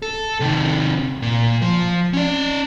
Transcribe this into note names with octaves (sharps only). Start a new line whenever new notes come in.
A4
C3 D#3
A#2
F3
C#4 D5